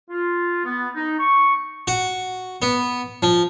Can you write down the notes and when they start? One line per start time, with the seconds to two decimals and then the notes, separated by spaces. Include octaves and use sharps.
0.09 F4
0.65 B3
0.95 D#4
1.20 C#6
1.88 F#4
2.62 B3
3.23 F3